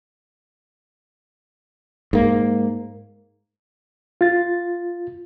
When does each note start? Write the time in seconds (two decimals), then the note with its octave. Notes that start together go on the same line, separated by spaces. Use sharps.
2.13 G#2 A#3
4.21 F4 A6